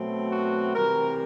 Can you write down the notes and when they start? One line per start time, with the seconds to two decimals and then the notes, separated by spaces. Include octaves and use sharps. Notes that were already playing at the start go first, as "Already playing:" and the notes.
Already playing: B2 F#3 A3 C4
0.30 F#4
0.74 C3 E3 G3 A#4